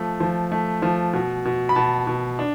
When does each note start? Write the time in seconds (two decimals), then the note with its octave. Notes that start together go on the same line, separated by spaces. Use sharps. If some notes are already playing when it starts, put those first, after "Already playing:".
Already playing: F3 A3
0.20 F3
0.52 A3
0.82 F3
1.13 B2
1.45 B2
1.69 B5
1.75 B2 A5
2.07 B2
2.39 D4